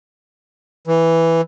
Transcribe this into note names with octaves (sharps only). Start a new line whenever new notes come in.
E3